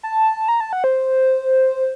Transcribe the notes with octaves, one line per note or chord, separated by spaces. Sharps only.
A5
A#5
A5
F#5
C5